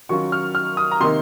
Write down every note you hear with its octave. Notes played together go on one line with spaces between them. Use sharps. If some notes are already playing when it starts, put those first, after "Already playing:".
D#3 F#3 C#4 F4 C#6
F6
F6
D#6
A#5
C3 D#3 A#3 D#4 C6